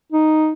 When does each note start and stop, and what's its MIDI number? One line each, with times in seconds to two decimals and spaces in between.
0.13 0.53 63